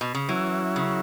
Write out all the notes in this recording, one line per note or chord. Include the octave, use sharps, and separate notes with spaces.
B2
C#3
E3 F#3 C#4 E4
C#3